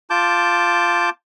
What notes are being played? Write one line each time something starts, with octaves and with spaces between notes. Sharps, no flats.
F4 A5 D6 G6